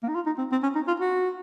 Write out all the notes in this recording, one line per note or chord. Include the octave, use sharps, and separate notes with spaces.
A#3
D#4
F4
D#4
C4
C4
C#4
D#4
F4
F#4